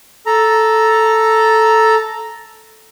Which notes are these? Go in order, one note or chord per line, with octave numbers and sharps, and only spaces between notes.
A4 A#5